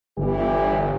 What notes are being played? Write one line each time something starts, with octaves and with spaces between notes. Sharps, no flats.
G1 E3 G4